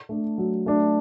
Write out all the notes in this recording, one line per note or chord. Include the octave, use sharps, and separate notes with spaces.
A3 D4
F#3
A3 D4